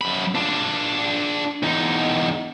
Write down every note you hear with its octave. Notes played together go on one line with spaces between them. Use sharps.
F#2 B5
D4 F4
E2 D#4